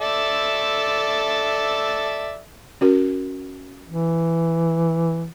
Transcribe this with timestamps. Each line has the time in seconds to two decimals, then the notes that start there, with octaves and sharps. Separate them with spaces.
0.01 A4 D5 E5
2.81 C#4 F#4 A#4
3.87 E3